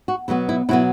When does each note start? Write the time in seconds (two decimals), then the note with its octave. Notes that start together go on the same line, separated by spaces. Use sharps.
0.08 F#4
0.28 B2 F#3 B3 E4
0.49 E4
0.69 B2 F#3 B3 E4